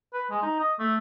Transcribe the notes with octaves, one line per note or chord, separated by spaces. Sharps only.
B4
G#3
D#4
D#5
A3